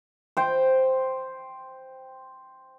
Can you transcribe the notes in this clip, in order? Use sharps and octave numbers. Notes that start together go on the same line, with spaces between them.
C5 G5